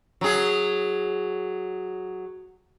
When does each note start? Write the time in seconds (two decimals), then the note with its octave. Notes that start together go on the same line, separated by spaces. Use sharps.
0.21 F#3 G#4